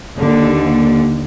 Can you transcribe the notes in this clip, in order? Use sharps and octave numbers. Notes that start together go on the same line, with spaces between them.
D#2 D3